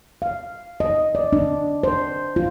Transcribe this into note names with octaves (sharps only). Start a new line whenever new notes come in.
F5
D#5
D5
D4
C5
F4